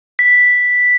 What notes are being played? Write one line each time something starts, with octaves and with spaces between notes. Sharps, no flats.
B6